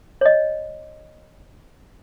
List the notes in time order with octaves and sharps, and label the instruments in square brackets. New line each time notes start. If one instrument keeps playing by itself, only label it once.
[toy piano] C#5 D#5